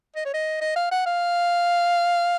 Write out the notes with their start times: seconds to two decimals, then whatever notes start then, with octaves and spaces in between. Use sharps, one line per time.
0.15 D#5
0.25 C#5
0.34 D#5
0.61 D#5
0.76 F5
0.91 F#5
1.06 F5